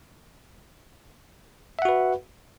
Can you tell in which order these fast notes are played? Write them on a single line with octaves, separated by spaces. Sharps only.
E5 F#5 F#4 B4